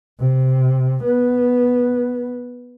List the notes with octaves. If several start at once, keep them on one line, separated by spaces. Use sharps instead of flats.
C3
B3